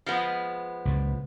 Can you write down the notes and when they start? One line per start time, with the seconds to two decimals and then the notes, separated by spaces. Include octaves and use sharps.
0.06 F3 G#3 B3
0.85 C#2 A#2